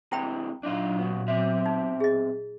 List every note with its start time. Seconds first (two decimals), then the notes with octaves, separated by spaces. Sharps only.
0.12 C3 E3 G#3 E4 G5 B5
0.63 A#2 F#3 D4 D#4 F4
0.99 C#3 B3
1.27 B2 C4 E5
1.66 D#4
2.00 G#4 D#5